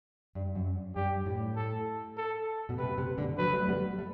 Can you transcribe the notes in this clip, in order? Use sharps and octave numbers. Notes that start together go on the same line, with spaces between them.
G2
F#2
G2 G4
A2
A4
A4
B2
C3 B4
C3
B2 D3
D3 F#3 B4
F#3 A3
G3 B3
A3